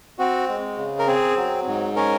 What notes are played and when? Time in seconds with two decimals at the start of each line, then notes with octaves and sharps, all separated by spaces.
0.19 C4 F#4
0.49 G#3
0.77 C#3
0.99 A#4
1.07 C4 G#4
1.37 F#3
1.67 G#2
1.96 C#4 A#4